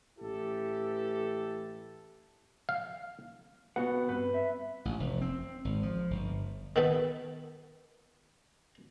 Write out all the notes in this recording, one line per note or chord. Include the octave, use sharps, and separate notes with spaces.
A1 E3 E4 G4 A4
F5
B1 B3 F#4 F#5
G2 C4 B4
E5
A1
F1
C4
G#1
F3
G1
D#3 B3 A4 B4